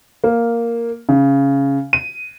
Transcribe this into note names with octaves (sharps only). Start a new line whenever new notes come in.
A#3
C#3
D#7